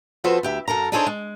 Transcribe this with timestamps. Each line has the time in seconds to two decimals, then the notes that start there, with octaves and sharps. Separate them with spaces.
0.24 F3 C4 F#4 A4 B4 C5
0.43 D2 G4 E5
0.68 F#2 A4 A#4 A#5
0.92 D4 D#4 G#4 A4 C5 C#5
1.07 G#3